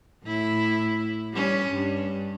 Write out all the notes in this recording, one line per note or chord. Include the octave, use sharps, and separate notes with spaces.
A2 E4
G3 C#4
G2